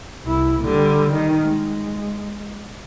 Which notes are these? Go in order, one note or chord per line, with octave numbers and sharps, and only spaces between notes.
C2 E4
D3 G3
D#3
G#3